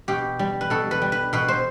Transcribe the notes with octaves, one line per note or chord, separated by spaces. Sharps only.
B2 G4
G3
B4
B2 A4
B4
G3
B4
B2 B4
C5